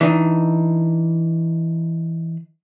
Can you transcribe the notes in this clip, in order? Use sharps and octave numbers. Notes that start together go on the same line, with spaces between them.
E3 D4 D#4